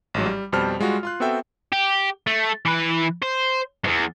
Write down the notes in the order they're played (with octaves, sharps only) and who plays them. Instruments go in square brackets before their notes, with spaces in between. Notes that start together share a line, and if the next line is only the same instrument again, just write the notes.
[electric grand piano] A1 G#2 F#3
G3
F2 B2 G3 C5 A5 F6
G3 G#3 F4 F#4
F4 C6 F#6
B3 C4 F#4 A4 E5 G5
[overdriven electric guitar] G4
A3
E3 B4
C5
E2 G2